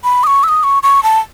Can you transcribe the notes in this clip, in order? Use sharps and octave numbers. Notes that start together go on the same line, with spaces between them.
B5
D#6
C#6
E6
D#6
C#6
C#6
A5